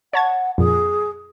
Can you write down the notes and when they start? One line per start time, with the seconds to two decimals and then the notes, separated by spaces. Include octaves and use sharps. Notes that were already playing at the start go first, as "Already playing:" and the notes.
0.13 C#5 F#5 A5 G#6
0.58 F2 A#2 G#4